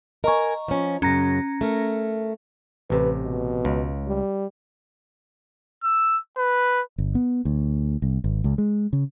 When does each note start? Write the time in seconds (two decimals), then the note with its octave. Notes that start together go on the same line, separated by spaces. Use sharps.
0.24 A#4 D#5 G#5 A#5 C#6
0.68 F3 C#4
1.02 F#2 C#3 C#4 A#5 A#6
1.61 A3 A#4
2.90 A1 C3 B4
3.22 B2
3.65 C#2
4.07 G3
5.83 E6
6.37 B4
6.98 G1
7.15 B3
7.45 D2
8.02 C2
8.24 G#1
8.44 C#2
8.58 G#3
8.93 C#3